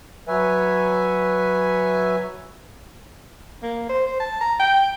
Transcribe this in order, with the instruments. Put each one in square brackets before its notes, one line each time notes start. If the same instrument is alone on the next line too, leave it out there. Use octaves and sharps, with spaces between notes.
[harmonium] F#3 B4 C#5 E5 G#5
[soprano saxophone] A#3
C5
C5
A5
A#5
G5